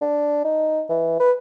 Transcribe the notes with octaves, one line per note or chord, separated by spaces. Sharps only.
D4
D#4
E3
B4